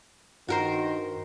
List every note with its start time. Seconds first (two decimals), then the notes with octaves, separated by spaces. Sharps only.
0.48 G2 D#3 F#4 A#4 C5